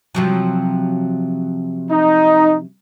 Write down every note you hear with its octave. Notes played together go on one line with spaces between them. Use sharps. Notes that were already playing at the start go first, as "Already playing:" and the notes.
C3 F3 F#3
D#4